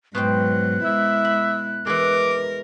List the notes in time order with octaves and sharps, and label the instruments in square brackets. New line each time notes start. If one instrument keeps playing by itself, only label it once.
[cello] G#2 F#3 [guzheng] B2 C5 G5 [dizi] F#6
[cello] G#3 E4 [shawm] E5
[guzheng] B5
[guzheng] E3 G#3 [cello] A#4 [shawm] D6